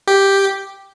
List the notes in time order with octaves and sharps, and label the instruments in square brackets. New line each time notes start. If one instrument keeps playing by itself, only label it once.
[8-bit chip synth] G4